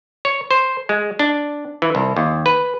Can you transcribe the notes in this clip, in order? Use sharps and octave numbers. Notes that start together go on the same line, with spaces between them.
C#5
C5
G#3
D4
E3
C2
D#2
B4